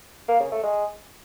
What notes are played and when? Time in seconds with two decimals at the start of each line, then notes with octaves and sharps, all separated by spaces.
0.28 A#3
0.40 C#3
0.52 A3
0.63 G#3